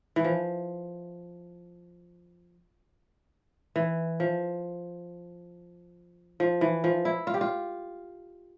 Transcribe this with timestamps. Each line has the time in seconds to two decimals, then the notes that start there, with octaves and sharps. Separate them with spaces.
0.16 E3
0.24 F3
3.76 E3
4.20 F3
6.40 F3
6.61 E3
6.84 F3
7.05 E4
7.27 F4
7.34 G4
7.41 F4